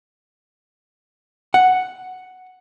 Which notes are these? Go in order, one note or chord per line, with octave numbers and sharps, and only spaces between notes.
F#5